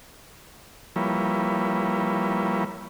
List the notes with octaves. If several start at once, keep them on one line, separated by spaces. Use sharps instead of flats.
F3 G3 A#3 E4 B4 C#5